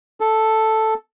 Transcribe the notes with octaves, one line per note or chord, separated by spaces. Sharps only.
A4